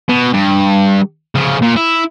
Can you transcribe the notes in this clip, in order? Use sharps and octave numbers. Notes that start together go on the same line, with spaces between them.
B2
G2
C#3 F3
A#2
E4